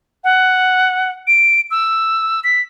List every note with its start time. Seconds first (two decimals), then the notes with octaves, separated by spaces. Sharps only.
0.24 F#5
1.27 D7
1.71 E6
2.44 B6